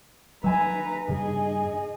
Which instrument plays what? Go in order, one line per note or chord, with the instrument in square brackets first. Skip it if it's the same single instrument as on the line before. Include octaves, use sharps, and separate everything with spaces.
[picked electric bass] F#3 [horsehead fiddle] B4 A#5 [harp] E5 G#5 B5
[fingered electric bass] G2 [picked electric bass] C#3 [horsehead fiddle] G#4 D#5